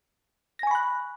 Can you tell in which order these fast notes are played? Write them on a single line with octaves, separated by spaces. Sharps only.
A#6 G#5 C#6 B5 F#6